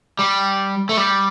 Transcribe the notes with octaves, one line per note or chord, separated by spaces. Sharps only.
G3
A3
G3